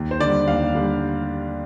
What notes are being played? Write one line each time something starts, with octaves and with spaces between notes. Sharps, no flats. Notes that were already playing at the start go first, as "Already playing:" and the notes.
Already playing: D#2
C5
D3 G3 D5
D#2 F5
D3 G3